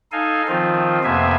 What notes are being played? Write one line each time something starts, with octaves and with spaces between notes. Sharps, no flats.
D#4 A4 F5 G#5
D#3 F3 C4 F4
F2 C3 A#3 B3 E5 G#5